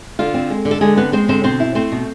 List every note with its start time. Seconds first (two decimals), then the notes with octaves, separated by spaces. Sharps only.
0.19 D3 F4
0.34 C4
0.50 G#3
0.65 D3
0.71 A4
0.81 D3 G#3 G#4
0.97 B3 C4 B4
1.12 G#3 C4 C5
1.28 D3 C4 C5
1.44 B2 C4 C5
1.60 E4
1.75 A3 C4 C5
1.92 B2